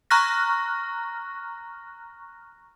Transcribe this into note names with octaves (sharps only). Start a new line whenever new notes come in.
A#5 C#6 F6 F#6 A#6